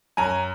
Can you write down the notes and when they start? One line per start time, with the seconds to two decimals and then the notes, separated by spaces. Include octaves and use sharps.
0.17 F#2 G#5 A#5